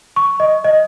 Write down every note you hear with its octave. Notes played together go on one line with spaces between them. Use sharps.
C#6
D#5
D#5